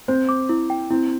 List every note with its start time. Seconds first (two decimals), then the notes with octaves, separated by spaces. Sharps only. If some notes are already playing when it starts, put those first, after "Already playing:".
0.08 C4 C5
0.29 D6
0.49 E4
0.70 G5
0.90 C4 E4